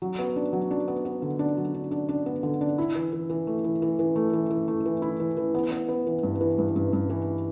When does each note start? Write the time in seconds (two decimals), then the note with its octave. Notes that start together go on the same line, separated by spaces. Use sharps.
0.02 F#3
0.19 B3
0.36 D4
0.53 F#3
0.71 D4
0.88 B3
1.05 B3
1.22 D3
1.39 D4
1.57 F#3
1.74 D4
1.91 D4
2.09 D4
2.26 B3
2.43 D3
2.61 D4
2.78 E4
2.95 E3
3.13 E3
3.30 E3
3.47 A3
3.64 E3
3.82 E3
3.99 E3
4.16 A3
4.33 E3
4.50 E3
4.68 A3
4.86 E3
5.02 E4
5.20 E3
5.37 E3
5.55 B3
5.72 B3
5.89 B3
6.07 E3
6.23 G2
6.41 E3
6.58 G2
6.76 G2
6.93 G2
7.10 E3